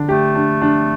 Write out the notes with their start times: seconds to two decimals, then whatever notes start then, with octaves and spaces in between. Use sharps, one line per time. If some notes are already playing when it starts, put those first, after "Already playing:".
Already playing: D3 D4
0.09 A3 G4
0.35 D4
0.62 D4